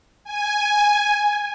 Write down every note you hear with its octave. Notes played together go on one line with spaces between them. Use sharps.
G#5